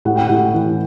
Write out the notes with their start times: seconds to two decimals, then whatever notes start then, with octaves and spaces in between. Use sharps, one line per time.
0.05 A2 F#5
0.16 G5
0.27 A2 F#5
0.54 E3